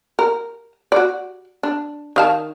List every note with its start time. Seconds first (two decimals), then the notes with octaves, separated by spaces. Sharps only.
0.19 A#4
0.92 F#4 D5
1.63 D4
2.16 D#3 F5 A5